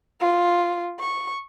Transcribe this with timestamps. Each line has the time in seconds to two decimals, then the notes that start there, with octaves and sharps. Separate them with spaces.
0.20 F4
1.00 C#6